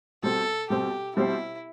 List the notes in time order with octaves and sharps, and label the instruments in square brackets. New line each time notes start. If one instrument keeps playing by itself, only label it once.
[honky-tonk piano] B2 G3 C4 [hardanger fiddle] A4
[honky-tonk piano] B2 G3 C4 [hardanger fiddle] G4
[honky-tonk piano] B2 G3 C4 G4 C5 [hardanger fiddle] E4